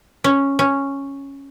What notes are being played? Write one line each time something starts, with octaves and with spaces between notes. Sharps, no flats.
C#4
C#4